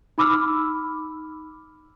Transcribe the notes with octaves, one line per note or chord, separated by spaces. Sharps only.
D#4 B5 D6 E6 F6